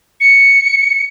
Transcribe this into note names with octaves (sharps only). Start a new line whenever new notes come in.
C#7